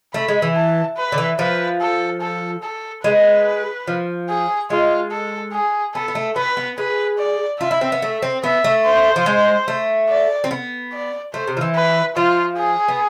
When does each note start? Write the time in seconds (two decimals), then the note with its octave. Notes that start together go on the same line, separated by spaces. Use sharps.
0.14 A3 B5
0.28 G#3
0.42 E3
0.56 A5
0.97 B4
1.12 D3
1.18 E3
1.39 F3 B4
1.81 A4
2.22 A4
2.63 A4
3.04 G#3 B4
3.87 F3
4.30 G#4
4.70 G#3 F4
5.11 A4
5.53 G#4
5.95 B3 A4
6.08 B3
6.15 A3
6.36 B3 B4
6.57 B3
6.78 G#4 B4
7.19 D5
7.60 F4 E5
7.71 E4
7.81 C4
7.92 B3
8.02 A3
8.22 C4
8.43 B3 E5
8.64 A3
8.85 C5
9.16 F3
9.26 G#3
9.68 A3
10.09 D5
10.44 C4
10.51 B3
10.93 D5
11.33 A3 C5
11.47 C3
11.57 F3
11.61 E3
11.75 B4
12.16 F3 F4
12.57 G#4
12.88 B3